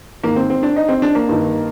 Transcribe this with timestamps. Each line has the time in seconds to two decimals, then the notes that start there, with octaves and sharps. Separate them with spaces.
0.23 G#2 D#3 A#3
0.36 C4
0.50 C4
0.63 D4
0.76 D#4
0.89 C4
1.02 D4
1.15 A#3
1.29 G2 D#3